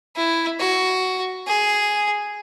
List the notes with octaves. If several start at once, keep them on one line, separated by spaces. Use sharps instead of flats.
E4
F#4
G#4